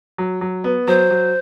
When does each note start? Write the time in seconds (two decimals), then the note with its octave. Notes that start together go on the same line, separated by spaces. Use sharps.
0.18 F#3
0.41 F#3
0.64 B3
0.87 F#3 C5
1.11 F#3